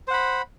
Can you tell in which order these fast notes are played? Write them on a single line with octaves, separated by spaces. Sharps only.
C5 F#5 B5